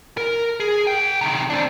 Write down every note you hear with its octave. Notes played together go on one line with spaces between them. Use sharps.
A#4
G#4
G#4 G5
C3 D#3
C4 D4